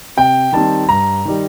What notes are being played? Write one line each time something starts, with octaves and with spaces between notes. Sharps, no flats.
C3 G5
D#3 G3 C4 A5
G2 A#5
D#3 G3